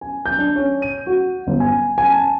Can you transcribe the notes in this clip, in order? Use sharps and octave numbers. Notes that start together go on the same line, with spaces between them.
G#5
G6
D4
C#4
D#7
F#4
G1
G#5
G#5
A5